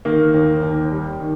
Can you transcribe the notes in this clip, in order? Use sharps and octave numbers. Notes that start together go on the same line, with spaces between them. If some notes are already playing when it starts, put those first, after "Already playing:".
D#3 A#3
D#2
D#2
G3
D#3